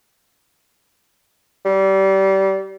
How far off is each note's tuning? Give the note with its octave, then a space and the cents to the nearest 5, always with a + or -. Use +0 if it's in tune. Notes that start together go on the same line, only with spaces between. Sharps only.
G3 -25